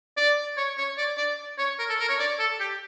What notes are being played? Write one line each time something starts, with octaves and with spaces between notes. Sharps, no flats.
D5
C#5
C#5
D5
D5
C#5
A#4
A4
A#4
C#5
D5
A4
G4